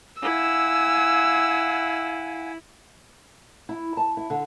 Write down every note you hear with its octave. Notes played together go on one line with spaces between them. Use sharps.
E4 F5 F#5 G#5 E6
E4
A5
E4
D3